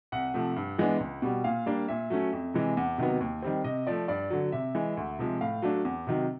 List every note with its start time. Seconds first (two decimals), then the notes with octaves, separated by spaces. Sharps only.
0.12 C2 F#5
0.34 C3 F3 A3
0.56 G2
0.78 E3 G#3 B3 D4
1.00 C#2
1.22 B2 G3
1.44 A#2 F5
1.66 G3 A#3 D4
1.88 A#2 E5
2.10 F#3 A3 C#4
2.33 F2
2.54 C3 E3 G#3
2.77 E2
2.98 C3 D#3 F#3 B3
3.21 D#2
3.43 D#3 G3 C4
3.64 C3 D#5
3.87 F3 A3 D5
4.08 G2 D5
4.30 D3 F#3
4.52 C3 E5
4.75 E3 G#3
4.97 D2
5.19 C3 F3 G#3
5.41 A2 F5
5.62 F#3 A3 D4
5.85 E2
6.07 C3 D#3 F#3